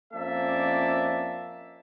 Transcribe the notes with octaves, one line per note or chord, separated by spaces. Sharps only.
F2 A#3 C#4 D4 E5 A5